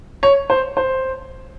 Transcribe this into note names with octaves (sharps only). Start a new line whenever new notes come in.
C#5
C5
C5